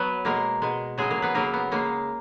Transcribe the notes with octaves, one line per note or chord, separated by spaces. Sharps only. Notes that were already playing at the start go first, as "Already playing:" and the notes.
Already playing: F#3 B3 B4
B2 G#3 A#3 A#4
B2 G#3
C#3 F#3 G#3 G#4
A#3 A#4
B3 B4
C#3 F#3 A#3 A#4
B3
C#3 G#3 A#3